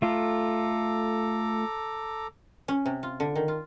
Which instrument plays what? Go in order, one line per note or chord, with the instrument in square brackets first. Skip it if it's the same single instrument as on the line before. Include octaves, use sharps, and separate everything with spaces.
[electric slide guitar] A3 F4 [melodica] A4 A#5 D6
[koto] C#4
C3
F4
D3
D#3
F4